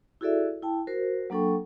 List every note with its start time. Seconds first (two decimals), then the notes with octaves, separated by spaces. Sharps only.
0.21 E4 F#4 G#4 A4 D5 E5
0.63 E4 G5 A5
0.87 F#4 A#4 C5
1.30 F#3 A#3 D4 A4 G5 C#6